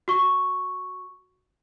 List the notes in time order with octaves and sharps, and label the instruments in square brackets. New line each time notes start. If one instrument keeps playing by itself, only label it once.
[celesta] F#4 C#6